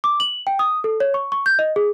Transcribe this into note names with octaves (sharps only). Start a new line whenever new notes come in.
D6
F#7
G5
D#6
A4
C#5
C#6
C#6
G6
D#5
G#4